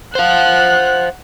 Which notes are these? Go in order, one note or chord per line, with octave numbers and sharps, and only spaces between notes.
C5 F5 F#5 F#6